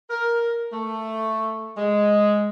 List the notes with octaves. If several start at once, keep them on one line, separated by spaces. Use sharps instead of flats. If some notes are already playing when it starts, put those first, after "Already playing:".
A#4
A3
G#3